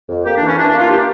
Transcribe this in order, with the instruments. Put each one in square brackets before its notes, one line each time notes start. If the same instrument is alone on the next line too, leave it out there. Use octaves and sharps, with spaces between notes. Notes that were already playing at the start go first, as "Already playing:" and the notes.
[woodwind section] F2
A#3 G4
D4
E3
C#4
E3 D4
D4
A#3
F4
A#3 G4